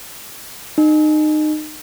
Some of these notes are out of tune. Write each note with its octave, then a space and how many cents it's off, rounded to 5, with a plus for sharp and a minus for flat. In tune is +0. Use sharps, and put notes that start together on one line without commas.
D#4 -25